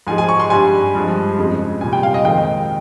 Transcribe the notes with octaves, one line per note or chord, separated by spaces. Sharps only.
G#2 F3 G#3 G#5
G#5
C#6
C6
G2 G3 G#5
G2 F3 G#3
F2 C#3 G#3
C2 A#2 G3 G#5
G5
F5
D#5
F2 D#3 G#3 G5